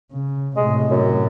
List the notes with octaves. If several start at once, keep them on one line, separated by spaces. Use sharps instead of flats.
C#3
A2 C3 G#3
F#2